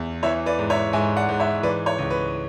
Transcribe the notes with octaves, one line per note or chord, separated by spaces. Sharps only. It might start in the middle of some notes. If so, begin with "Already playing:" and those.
Already playing: E2 E5
E3 C#5 E5
B4 D5
G#2
C#5 E5
G#2 E5 G#5
D5 F#5
G#2
C#5 E5
E3 B4 D5
C#5
C#2
B4